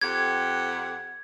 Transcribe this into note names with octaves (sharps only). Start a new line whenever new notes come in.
F2 G4 F#5 G#6